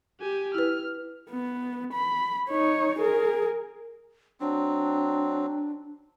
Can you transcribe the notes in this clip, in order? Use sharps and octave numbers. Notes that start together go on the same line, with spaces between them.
G4 G#5
E4 B4 F6
B3
B5
D#4 C#5
G#4 A#4
F#3 C4 D4